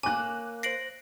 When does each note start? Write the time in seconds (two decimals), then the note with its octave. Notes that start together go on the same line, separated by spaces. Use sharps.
0.03 A#3 C#4 G#5 D6 F#6
0.63 C5 A#6 C7 D7 F#7